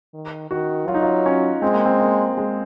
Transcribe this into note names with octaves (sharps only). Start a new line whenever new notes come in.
D#3
D#3 F#4
F#3 F4
D#4
F4
C#4
G#3 C4
A#3
C4
A#3
G#3